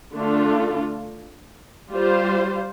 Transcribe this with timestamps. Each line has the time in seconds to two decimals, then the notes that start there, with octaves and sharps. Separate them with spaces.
0.14 D3 A3 D4 F4 A4
1.90 G3 F4 C5